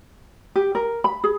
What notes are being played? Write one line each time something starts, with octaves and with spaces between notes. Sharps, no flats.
G4
A#4
B5
G#4